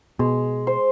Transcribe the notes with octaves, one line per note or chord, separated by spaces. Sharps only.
B2 G#3
C5